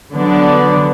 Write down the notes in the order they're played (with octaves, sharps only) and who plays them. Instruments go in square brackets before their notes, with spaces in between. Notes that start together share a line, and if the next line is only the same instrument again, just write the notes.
[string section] D3 F#3 B3 D4